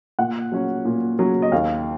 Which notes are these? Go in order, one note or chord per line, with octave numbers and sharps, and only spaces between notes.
A#2 F#5
F#3 C#4
A#2
F#3 C#4
D#5
D#2 F5